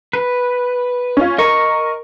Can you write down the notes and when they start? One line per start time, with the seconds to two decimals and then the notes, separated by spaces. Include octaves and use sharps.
0.13 B4
1.17 C#4 F4
1.38 A#4 D#5 C#6